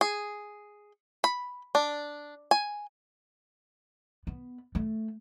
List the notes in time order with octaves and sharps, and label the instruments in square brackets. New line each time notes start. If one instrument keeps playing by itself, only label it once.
[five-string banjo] G#4
B5
D4
G#5
[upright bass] B3
A3